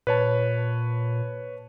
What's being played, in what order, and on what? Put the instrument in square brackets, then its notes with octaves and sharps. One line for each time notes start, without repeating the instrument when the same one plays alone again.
[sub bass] A#2 [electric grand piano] B4 C#5 A5